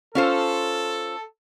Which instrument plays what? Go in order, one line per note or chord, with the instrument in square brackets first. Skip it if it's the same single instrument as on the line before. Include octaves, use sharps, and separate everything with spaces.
[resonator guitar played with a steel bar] C#4 F4 C5 [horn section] A4